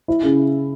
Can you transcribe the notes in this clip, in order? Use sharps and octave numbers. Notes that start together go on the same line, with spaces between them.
E4
C#3